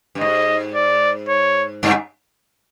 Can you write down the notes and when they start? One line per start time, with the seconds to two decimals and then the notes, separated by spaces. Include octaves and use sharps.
0.15 G2
0.21 G#2 D#5
0.75 D5
1.29 C#5
1.83 G2